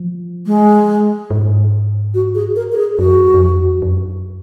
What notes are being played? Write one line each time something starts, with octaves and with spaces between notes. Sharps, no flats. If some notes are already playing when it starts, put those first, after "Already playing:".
Already playing: F3
G#3
G#2
F#4
G#4
A#4
A#4
G#4
F#2 F#4
F#2
F2
F#2